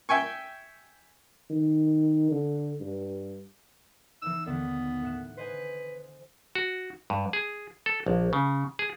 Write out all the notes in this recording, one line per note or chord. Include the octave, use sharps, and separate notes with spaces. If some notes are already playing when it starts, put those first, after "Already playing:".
E5 G5 G#5 C#6
D#3
D3
G2
E3 B3 D#4 E6
D#2 B2 D3 B3
A2 F#5 E7
B4 C5 D#5 G#5
F#4
G2
G#4
A4
A#1
C#3
G#4